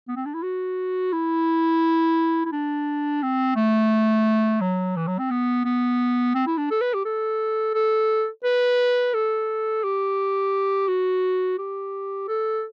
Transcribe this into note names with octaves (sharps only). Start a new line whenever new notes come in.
B3
C4
D4
E4
F#4
E4
E4
D4
C4
A3
F#3
E3
F#3
C4
B3
B3
C4
E4
D4
A4
B4
G4
A4
A4
B4
A4
G4
F#4
G4
A4